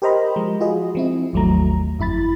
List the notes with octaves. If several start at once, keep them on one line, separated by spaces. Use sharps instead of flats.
G4 A#4 C5 D#5 A#5 B5
F3 G#3
F4 F#4 G#4 D#5
F3 C4 E4
G#1 D#2 F#3 A3 A#5
G1 F2 E4 B5 A6